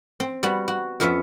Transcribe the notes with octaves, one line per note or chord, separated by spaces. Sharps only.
C4
G3 B3 F#4
F#4
F2 F3 B3 C#4 E5